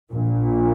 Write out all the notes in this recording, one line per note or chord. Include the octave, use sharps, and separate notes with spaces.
A#1 A#2